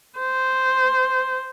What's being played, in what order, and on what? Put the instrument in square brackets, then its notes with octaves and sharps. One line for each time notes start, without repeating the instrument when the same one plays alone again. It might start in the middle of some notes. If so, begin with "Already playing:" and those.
[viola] C5